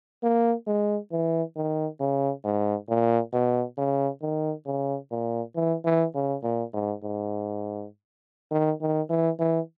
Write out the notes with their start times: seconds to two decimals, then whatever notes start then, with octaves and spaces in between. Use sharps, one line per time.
0.23 A#3
0.67 G#3
1.12 E3
1.56 D#3
2.00 C#3
2.44 G#2
2.89 A#2
3.33 B2
3.77 C#3
4.22 D#3
4.66 C#3
5.11 A#2
5.55 E3
5.85 E3
6.15 C#3
6.43 A#2
6.73 G#2
7.03 G#2
8.51 D#3
8.81 D#3
9.10 E3
9.39 E3